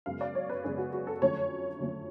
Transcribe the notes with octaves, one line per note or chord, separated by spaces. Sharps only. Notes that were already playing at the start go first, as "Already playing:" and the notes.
F#2 C#3 G#3 B3 F5
D5
C#5
B4
F#2 C#3 G#3 B3 G#4
F#4
F#4
A4
F2 D3 F#3 A3 C#4 C#5
F2 D3 F#3 A3 C#4